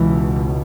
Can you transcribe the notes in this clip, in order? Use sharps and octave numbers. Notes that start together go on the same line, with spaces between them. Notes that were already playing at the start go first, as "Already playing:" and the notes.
Already playing: C#2 B2 E3